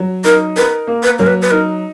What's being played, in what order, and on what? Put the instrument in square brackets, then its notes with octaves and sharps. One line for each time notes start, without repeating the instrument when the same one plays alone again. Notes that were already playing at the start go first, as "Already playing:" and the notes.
Already playing: [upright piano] F#3
[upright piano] D#4 [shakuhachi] A#4
[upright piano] A#4 [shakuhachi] B4
[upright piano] A#3
[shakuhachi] B4
[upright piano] F#3 [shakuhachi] A#4
[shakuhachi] B4
B4
[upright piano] D#4 [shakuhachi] A#4